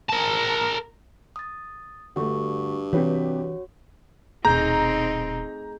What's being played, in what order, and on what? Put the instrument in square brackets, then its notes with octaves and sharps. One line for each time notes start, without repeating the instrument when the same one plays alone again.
[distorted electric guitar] A#4 A5
[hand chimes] D#6 A6
[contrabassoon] G2 [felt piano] D3 A3 [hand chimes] F#4 C#6
[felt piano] C3 G4 B4 [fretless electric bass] E3 [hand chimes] F#4 C#5
[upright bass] D#1 B2 [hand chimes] A3 G#4 G6 [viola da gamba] C4 D#4 [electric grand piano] A#5